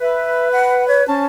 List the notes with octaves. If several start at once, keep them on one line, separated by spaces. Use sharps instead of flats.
B4 E5
F#5
C#5
C#4 C5 G#5 A5